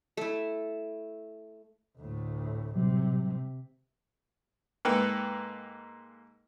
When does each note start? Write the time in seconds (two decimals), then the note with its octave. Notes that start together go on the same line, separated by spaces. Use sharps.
0.17 A3 E4
1.97 D2 A2
2.75 A2 C3 F#3 G3
4.85 G#2 A#3 A4 B4 G5